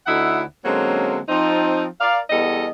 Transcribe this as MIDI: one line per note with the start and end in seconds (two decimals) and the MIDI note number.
0.06 0.42 38
0.06 0.42 50
0.06 0.42 63
0.06 0.42 64
0.06 0.42 76
0.06 0.42 78
0.64 1.19 50
0.64 1.19 54
0.64 1.19 56
0.64 1.19 58
0.64 1.19 60
0.64 1.19 61
1.29 1.85 53
1.29 1.85 60
1.29 1.85 63
2.01 2.19 70
2.01 2.19 74
2.01 2.19 77
2.30 2.68 40
2.30 2.68 55
2.30 2.68 59
2.30 2.68 69
2.30 2.68 75